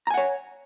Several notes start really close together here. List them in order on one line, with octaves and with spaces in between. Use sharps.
A#5 G#5 F#5 C#5